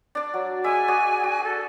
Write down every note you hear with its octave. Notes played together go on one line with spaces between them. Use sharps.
D4 D5
F#3
G#3 E5 G#5
F#4 G#4 D5
F#4
A4